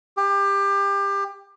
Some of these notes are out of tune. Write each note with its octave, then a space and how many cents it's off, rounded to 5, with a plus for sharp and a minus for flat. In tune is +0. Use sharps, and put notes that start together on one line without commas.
G4 +25